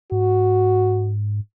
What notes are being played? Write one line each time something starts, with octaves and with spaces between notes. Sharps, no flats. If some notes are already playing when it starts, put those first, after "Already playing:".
G#2 F#4